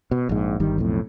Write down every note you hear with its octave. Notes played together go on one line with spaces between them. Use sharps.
B2
A#1 G#2
G1 D#3 G3
B1 F2 A2